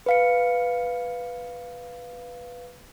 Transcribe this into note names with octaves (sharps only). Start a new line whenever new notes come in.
B4 F5 C#7